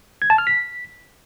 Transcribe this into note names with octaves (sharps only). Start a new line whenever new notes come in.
G#6
A5
F6
B6